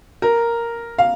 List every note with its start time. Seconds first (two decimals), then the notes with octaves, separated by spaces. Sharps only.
0.22 A#4
0.98 F5